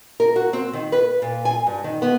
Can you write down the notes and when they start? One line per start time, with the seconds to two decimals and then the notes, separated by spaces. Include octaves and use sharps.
0.20 A#4
0.36 F#4
0.53 C4
0.73 D#3
0.92 B4
1.22 A#2
1.45 G#5
1.67 G2
1.84 D#3
2.02 B3